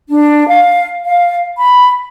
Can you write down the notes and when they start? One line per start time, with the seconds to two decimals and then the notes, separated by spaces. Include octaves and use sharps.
0.10 D4
0.48 F5
1.04 F5
1.57 B5